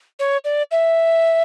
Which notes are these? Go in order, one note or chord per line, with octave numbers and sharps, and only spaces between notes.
C#5
D5
E5